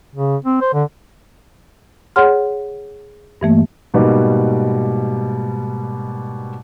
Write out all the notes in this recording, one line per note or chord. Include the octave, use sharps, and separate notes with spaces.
C#3
C4
C5
D3
G#4 C#5 F#5 C6 F6
G2 E3 A3 A#3
G#2 B2 G3 A#3 B4 D#5